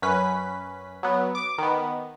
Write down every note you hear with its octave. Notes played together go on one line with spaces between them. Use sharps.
F#2 C#4 B4 B6
F#3 B3
D6
D#3 B3